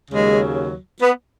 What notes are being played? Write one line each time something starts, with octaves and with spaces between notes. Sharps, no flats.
D#2 C#3 F#3 G#3
B3